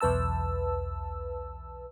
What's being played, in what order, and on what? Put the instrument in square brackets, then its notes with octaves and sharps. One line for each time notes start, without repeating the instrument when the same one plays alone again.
[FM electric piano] B1 E2 B4 A5 E6